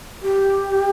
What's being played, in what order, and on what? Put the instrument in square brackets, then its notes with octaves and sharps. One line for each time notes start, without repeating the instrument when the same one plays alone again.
[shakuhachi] G4